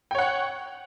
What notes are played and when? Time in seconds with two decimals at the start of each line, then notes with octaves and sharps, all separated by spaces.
0.11 G5
0.15 C#5
0.18 F#5